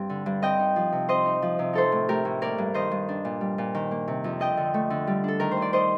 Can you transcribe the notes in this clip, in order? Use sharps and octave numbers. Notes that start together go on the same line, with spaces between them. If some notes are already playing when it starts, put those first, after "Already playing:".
Already playing: G2 G3 C4
D3
G2
C4 D#5 G5
D#4
F3
C3
C4 C5 D#5
D#4
F3
C3
D#4 A4 C5
A2
A3 G4 A#4
A2
A#3 A#4 D5
G2
D#3 C5 D#5
G2
D4
A#2
G3
A#2
D#3
A#3
C3
F2
D4 D#5 G5
D3
A3
D3
G3
D4 A4
D#3 A#4
C5
D#2
D5
D#4 C5 D#5